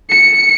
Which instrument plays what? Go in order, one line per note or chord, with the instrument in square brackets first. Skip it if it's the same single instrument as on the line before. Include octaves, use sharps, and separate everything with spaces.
[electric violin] C#7